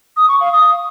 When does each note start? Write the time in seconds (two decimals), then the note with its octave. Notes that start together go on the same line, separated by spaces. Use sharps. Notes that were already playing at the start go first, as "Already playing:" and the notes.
0.17 D#6
0.28 C#6
0.40 F5
0.52 D#6